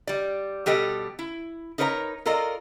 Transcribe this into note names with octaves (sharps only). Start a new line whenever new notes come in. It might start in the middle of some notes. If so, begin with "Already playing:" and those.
G3 D5
B2 G3 G4 A4 D#5
E4
D#4 A#4 B4 C#5 D5 A#5
F4 A4 A#4 D5 D#5